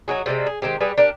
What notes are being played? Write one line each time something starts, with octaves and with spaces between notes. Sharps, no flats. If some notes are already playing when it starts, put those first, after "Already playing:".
F#3 D#4 F#4 G#4
C3 G3 G#3 C4
G#4
D#3 G#3 C4 G4
G3 G4 G#4 B4
D4 G4 A#4